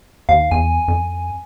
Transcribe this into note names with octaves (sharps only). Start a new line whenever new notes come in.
D#2 F5
E2 G#5
F2